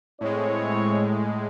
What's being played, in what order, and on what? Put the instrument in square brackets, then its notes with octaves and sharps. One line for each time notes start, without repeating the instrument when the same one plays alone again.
[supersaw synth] A2 G#3 [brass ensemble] C4 E4 C#5